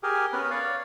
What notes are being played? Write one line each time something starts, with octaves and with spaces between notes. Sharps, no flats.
G4 G#4 A#4
B3 C#4 A#4 B4
C#5 D5 F5